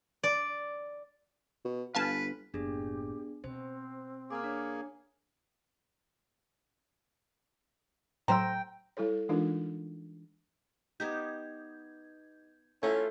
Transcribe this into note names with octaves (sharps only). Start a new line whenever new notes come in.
D5
B2
G1 B4 F5 G#5 A5
F#1 A2 B3 D4 G4 G#4
B2 C4 C5
A#3 G#4 D6 F6
D4 C#5
A2 F#3 C5 G5 A#5 E6
G3 E4 A4 C#5
E3 G#3 D4 D#4 F4 A#4
B3 D#4 G4 G6 G#6
A3 C#4 E4 F4 A4 C#5